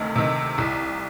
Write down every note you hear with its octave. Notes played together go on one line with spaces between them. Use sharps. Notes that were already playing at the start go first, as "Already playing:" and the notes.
Already playing: D2 C3 D#3
C3 D#3
C2